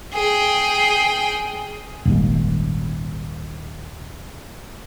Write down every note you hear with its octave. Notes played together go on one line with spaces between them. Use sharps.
G#4 G5
D#1 G#1 D#2